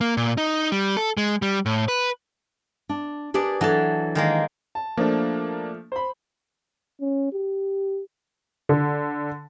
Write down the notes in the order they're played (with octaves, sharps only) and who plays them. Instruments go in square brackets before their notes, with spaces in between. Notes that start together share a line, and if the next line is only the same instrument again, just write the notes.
[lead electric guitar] A#3
A#2
D#4
G3
A4
G#3
G3
A2
B4
[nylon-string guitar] D4
[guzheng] D4 G#4 D5 [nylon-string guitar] G4 A#4 B4
[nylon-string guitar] E3 D4 A4 [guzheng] F#3 A5
[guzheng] D#3 G#3 A#3
[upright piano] A5
[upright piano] F3 A3 [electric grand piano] A#3 D4
[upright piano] C5 B5
[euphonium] C#4
G4
[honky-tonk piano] D3